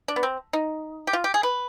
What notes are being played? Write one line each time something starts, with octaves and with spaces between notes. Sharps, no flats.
D4
B3
C4
D#4
G4
F4
G4
G#4
B4